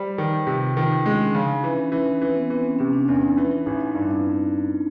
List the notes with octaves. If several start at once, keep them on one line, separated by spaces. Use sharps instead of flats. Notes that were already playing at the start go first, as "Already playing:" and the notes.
Already playing: G3 C5
D#3 B4
C3 F4
F4
D#3 F4
D#4
C#4
G#3 D4
C#3 D#4
E3 C#4
E3
E3 C4
B3
E3 C4
C#4
C3 C#4
D4
E2 D4
D#4
E3 E4
E4
A1 D#4
D#4
G2 D4
C4